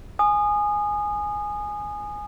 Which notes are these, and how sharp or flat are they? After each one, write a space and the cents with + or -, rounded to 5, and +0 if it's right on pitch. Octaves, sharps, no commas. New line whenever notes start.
G#5 +0 D#6 -25